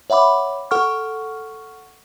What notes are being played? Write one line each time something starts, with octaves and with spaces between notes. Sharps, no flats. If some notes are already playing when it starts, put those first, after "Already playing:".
C#5 E5 F#5 B5 D6
A4 F#5 C#6 F6